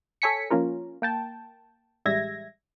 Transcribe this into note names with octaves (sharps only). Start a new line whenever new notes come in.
A4 C#5 G#5 B6 C#7
F3 A#3 C#4 F4 A#4
A#3 G5 A5
A1 G3 G#3 E5 G#6 A#6